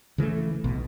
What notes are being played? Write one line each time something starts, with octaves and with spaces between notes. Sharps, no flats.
C#3 E3 G#3 A3
B1 B2